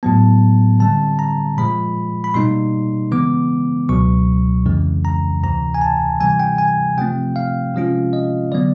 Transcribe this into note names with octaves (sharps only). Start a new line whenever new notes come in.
A2 F#3 B3 A5
D3 G3 C4 A5
A#5
A#2 F3 G#3 B5
B5
B2 G3 A#3 D#4 C6
C#3 E3 G#3 B3 D6
C#2 B2 F#3 C#6
F2 C#3 E3 G#3
A#5
D2 C3 E3 A#5
G#5
A5
C3 E3 G3 G#5
G5
G#5
C3 F3 A3 C4 G5
F5
C3 F3 G#3 C#4 F4
D#5
D3 F#3 B3 D5